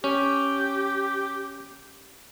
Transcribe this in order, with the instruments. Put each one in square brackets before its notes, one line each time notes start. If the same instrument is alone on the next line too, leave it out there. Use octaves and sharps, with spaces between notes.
[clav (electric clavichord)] C#4 [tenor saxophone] G4